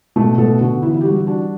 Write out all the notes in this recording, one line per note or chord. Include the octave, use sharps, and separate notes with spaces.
B2 A3 A4
A3 B3 A4
D3 F#4
E3 E4
E4
G4
G3 F#4
E4
D4 F#4